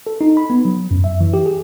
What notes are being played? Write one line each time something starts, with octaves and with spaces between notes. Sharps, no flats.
A4
D#4
B5
B3
F#3
F#2
E5
E3
G4
G#4